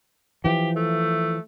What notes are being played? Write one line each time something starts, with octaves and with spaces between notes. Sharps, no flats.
E3 F3 G4
A3